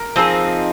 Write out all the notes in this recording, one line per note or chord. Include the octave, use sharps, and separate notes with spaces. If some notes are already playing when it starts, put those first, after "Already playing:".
Already playing: A#4
F3 C4 D#4 G#4